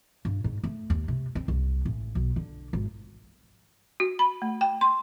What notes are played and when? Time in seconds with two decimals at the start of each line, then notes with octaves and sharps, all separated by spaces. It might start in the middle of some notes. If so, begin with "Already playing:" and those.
0.25 G2
0.44 G#2
0.64 A3
0.90 D#2
1.08 C3
1.35 C4
1.48 C2
1.85 A1
2.15 B1
2.36 D3
2.73 G#1
4.00 F#4
4.19 B5
4.42 A3
4.61 G5
4.81 C6